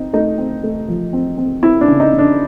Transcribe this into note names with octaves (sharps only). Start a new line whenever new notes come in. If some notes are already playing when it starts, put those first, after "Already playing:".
Already playing: C4 D#4
A3 D#4
C4
A3
F3
C4
C4
C4 E4
D4
C#3
D#4
C#3
D4